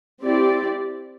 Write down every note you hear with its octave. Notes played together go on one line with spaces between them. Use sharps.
C4 E4 G4 D5